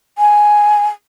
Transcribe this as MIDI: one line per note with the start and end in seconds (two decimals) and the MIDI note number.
0.18 0.85 80